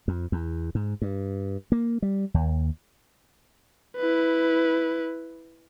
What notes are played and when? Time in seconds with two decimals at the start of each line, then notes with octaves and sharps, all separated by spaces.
0.08 F2
0.32 E2
0.75 G#2
1.02 G2
1.72 A#3
2.02 G3
2.34 D#2
3.97 E4 B4